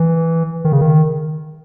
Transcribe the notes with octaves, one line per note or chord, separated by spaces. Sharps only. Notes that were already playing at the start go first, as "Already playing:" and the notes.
Already playing: E3
D#3
C#3
D#3